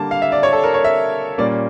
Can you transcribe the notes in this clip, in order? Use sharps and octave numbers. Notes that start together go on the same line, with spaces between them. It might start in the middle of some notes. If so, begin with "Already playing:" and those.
Already playing: D3 G3 A#3 A5
F5
E5
D5
C#5
A4
A#4
C#5
E5
A#2 G3 A#3 C#4 D5